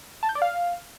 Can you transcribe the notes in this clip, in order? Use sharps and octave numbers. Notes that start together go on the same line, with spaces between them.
A5
G6
D5
F5